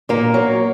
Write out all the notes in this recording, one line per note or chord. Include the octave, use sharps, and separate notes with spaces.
A#2 A#3
F#3